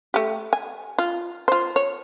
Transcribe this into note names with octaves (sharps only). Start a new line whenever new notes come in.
A3 G4
G#5
F4
F4 C5
C#5